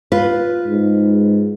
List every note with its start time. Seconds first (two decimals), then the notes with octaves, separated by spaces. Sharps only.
0.12 F4 B4
0.67 G#2